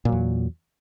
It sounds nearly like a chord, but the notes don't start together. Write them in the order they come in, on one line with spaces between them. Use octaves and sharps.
A#2 F#3 E2